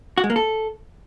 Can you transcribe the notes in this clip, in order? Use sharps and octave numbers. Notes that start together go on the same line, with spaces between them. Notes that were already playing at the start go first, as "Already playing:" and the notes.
F#4
G#3
A#3
A4